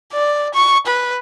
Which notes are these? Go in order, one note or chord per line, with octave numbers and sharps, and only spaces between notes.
D5
C#6
B4